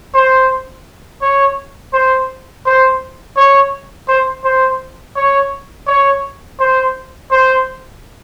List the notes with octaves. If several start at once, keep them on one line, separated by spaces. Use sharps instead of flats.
C5
C#5
C5
C5
C#5
C5
C5
C#5
C#5
C5
C5